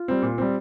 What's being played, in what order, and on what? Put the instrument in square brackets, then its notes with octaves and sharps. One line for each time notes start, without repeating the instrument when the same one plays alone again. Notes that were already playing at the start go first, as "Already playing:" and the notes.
Already playing: [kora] F4
[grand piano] G3 C4
A#2
G3 C4